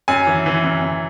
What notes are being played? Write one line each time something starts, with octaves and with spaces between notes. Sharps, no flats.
F#2 G#5
E3
E3
F#2
F#2